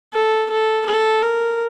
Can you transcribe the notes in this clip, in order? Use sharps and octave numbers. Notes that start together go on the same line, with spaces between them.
A4
A4
A4
A#4